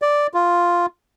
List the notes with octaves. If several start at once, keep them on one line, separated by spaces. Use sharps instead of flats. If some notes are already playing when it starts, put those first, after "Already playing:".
D5
F4